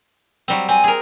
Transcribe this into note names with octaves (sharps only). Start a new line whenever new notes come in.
F#3 G3 C4
C4 G#5
G#4 A#4